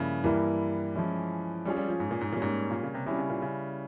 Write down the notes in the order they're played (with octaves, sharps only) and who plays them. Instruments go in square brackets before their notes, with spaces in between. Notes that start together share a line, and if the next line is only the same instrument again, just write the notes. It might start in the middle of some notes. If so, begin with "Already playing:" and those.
Already playing: [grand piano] G2 F3 A#3 E4 [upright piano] C#3
[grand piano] G2 G3 A#3 E4 A#4 [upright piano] E3
[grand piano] F3 G#3 C#4 E4
[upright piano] G3 [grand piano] G#3 C#4 F4 G#4
[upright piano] G3
F3
G#2
A#2
G#2
[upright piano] A#2 [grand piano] G3 A#3 C#4
[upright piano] G#2
A#2
C#3
C3
[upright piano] C3 [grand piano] G3 C#4 E4
[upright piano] C#3
A#2
C#3